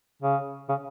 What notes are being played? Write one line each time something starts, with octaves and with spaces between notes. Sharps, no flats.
C#3
C#3